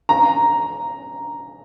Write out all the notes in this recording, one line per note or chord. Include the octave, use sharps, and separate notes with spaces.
A#5